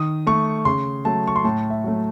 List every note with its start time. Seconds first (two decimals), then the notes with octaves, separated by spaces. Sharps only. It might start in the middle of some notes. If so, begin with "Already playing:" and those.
Already playing: D#3 D#6
0.27 A3 C#6
0.65 C#3 C6
1.05 F#3 A3 A5
1.27 C#6
1.36 C6
1.44 A2 A5
1.70 E5
1.84 F#3 A3